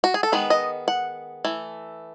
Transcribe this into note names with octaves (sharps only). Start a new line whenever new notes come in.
F#4
G#4
A4
D#3 G#3 B3 B4
D#5
F#5
E3 A3